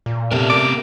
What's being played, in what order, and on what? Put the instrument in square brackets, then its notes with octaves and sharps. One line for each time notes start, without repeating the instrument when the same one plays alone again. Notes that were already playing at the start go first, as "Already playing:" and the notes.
[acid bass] A#2
[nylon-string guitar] C3 [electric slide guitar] B3 A4 A#4
[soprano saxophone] D6